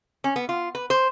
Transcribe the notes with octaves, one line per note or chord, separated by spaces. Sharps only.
C#4
B3
F4
B4
C5